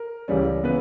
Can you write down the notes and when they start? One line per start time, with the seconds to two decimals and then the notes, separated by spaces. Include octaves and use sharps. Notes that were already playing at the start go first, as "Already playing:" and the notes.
Already playing: A#4
0.28 C#2 C#3 E3 G3 C#4
0.64 C#3 E3 B3 B4